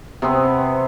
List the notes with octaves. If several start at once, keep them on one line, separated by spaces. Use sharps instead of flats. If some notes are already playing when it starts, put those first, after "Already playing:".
C3 B3 C4